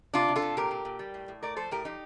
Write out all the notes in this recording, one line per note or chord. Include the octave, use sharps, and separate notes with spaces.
C3 D4 F4
C3
F4 A4
C3
A#2 G4 A#4
A#2
A#2
G3
A2
A2
A3 A#4 D5
F3 A4 C5
A2 G4 A#4
F3 D#4 G4